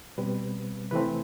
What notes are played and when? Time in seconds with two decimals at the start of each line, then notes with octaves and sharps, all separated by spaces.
0.18 B2 G3 C4 B4
0.91 C3 E3 A3 C4 B4